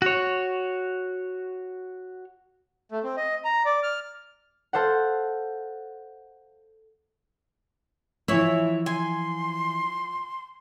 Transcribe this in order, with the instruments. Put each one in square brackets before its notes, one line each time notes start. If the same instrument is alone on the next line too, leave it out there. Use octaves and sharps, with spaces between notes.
[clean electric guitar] F#4 C#5
[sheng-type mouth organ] A3
C4
D#5
A#5
D5
F6
[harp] A4 C5 F5 F#5
[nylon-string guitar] E3 E5 [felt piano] F3 [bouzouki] E4 C#5
[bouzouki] G#5 [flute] C6